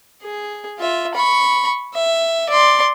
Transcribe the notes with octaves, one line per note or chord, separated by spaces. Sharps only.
G#4
F4 E5
B5 C#6
E5
D5 C6